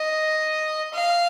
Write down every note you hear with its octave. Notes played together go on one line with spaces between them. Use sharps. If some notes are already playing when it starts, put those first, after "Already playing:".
Already playing: D#5
F5